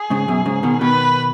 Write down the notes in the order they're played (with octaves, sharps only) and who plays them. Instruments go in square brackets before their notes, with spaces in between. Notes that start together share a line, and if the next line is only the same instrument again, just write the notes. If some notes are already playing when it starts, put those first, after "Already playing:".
Already playing: [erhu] G#4
[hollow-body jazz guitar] G#2 C#3
F#2 B2
G#2 C#3
B2 D#3
[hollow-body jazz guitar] B2 D#3 [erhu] B4